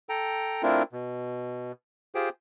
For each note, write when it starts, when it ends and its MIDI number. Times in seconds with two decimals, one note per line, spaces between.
0.09 0.62 69
0.09 0.62 79
0.09 0.62 82
0.63 0.83 57
0.63 0.83 60
0.63 0.83 62
0.63 0.83 64
0.63 0.83 65
0.63 0.83 70
0.93 1.72 47
2.15 2.29 65
2.15 2.29 67
2.15 2.29 68
2.15 2.29 72
2.15 2.29 79